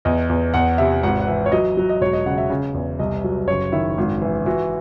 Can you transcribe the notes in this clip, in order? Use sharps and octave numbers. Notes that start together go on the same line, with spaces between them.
E2 D#5
E2
E2 F#5
C3 E5
G#1 F#5
F#5
E3 E5
C#5
F#3 D#5
F#3
D#5
E1 C#5
D#5
C#3 F#5
E5
C#3
E2
C2 D#5
F#3
F#1 C#5
D#3 E4
G#1
E3
E3 F#4